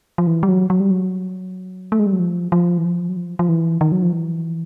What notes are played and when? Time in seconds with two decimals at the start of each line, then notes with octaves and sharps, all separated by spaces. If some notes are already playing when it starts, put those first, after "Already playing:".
0.18 F3
0.27 E3
0.43 G3
0.49 F#3
0.70 F#3
0.80 G3
0.91 F#3
1.92 A3
1.99 G#3
2.06 G3
2.13 F#3
2.20 F3
2.52 F3
2.78 E3
2.85 F3
3.09 F#3
3.17 F3
3.39 F3
3.49 E3
3.81 D#3
3.92 F#3
4.03 F3
4.13 E3